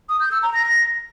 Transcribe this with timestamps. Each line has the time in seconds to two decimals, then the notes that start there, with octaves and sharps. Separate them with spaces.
0.09 D#6
0.20 G6
0.31 E6
0.43 A#5
0.54 A#6